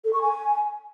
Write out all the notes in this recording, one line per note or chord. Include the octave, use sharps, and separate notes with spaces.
A4
C#6
G#5